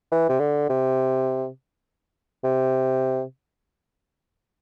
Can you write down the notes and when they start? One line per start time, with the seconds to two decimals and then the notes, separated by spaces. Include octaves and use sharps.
0.12 E3
0.29 C3
0.40 D3
0.70 C3
2.44 C3